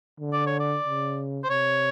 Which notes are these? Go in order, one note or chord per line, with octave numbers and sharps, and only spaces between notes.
D3
D5
C#5
D5
C#3
C5
C3 C#5